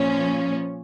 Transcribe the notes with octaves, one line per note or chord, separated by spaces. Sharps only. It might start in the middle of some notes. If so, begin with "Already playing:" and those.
Already playing: A#2 F3 C#4